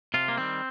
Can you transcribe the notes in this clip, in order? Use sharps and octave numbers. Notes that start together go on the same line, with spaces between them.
C3 F4
A#3
D#3 G3 C4